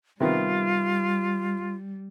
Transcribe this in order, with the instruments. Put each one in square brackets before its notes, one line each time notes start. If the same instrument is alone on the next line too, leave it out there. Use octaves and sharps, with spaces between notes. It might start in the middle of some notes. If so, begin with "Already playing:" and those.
[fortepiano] C3 D#3 B3 [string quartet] G3 [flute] F4